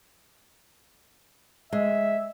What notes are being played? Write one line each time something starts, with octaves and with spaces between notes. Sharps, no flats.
G#3 E5